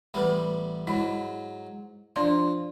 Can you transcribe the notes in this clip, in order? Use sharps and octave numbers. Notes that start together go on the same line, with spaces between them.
A1 G3 B3 B4 B5
G#2 F#3 E4 B5
F3 D4 D5 C6